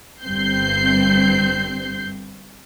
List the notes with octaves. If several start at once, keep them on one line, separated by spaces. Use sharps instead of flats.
G1 G2 C4 G6 C7